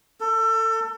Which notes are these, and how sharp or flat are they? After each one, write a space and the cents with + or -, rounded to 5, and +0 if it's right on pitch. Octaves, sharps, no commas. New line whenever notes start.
A4 +25